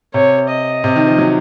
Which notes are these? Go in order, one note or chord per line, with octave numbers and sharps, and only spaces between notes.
C3 C#5
D#5
C3
D#3
F3
F#3